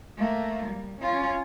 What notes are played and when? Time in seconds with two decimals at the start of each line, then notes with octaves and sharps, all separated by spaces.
0.17 A3 A#3
0.66 G3
1.00 C#4 F4